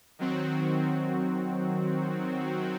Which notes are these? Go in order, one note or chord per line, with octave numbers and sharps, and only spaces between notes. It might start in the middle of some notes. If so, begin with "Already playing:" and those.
D#3 F#3 C4 F#4